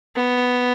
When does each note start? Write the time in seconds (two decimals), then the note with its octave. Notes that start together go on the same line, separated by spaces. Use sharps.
0.16 B3